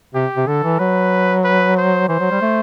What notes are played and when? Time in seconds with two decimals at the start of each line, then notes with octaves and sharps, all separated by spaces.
0.15 C3 G4
0.37 C3
0.47 D3 A4
0.63 E3
0.79 F#3 B4
1.44 B4
1.77 C5
2.09 E3 C5
2.20 F#3
2.31 G3
2.41 A3